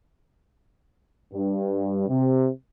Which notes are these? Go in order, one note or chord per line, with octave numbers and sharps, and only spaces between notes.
G2
C3